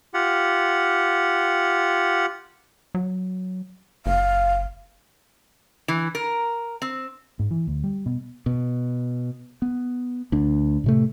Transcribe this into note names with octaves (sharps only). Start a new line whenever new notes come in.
F4 G4 F#5
F#3
F#1 F5
E3
A#4
C4
G#2
E3
D2
G3
B2
B2
B3
D2 D4
A2 C3 A3